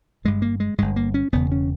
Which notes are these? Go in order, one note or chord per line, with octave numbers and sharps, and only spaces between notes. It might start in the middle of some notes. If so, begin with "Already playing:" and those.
G1 G2 G#3
A#3
G#3
G1 G2 G#3
A#3
C#4
E1 E2 C#3 B3
C#4